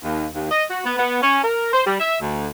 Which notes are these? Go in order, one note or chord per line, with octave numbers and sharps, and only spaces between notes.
D#2
D#2
D#5
F#4
B3
B3
C#4
A#4
C5
G3
E5
D2